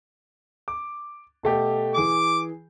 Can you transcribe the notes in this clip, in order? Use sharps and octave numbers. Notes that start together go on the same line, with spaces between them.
D6
B2 A3 G4
E3 G#4 D6